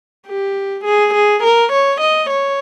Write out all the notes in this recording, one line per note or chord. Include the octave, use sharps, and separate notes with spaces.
G4
G#4
G#4
A#4
C#5
D#5
C#5